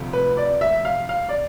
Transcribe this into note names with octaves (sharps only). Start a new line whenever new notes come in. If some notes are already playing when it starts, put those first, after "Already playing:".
Already playing: D2 C3 F3
B4
D5
E5
F5
F5
D5